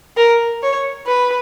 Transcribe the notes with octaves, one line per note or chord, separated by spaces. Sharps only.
A#4
C#5
B4